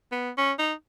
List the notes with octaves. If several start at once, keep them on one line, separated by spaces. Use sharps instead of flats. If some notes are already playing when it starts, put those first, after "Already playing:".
B3
C#4
D#4